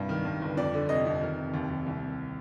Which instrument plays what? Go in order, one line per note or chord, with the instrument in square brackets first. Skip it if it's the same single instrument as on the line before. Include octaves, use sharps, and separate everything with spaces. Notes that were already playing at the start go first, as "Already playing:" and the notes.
Already playing: [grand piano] C2 G2
D#3
G2
G1
F2 D5
D3
F1 D#5
F2
D#3
F1
D#2
D#2
C2
C3